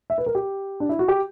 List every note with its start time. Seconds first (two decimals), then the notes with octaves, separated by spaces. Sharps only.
0.10 E5
0.18 B4
0.26 A#4
0.35 G4
0.80 D4
0.89 E4
0.99 F#4
1.08 G4